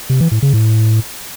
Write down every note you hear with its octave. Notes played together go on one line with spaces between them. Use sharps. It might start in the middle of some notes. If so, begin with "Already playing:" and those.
C3
E3
A2
C#3
A2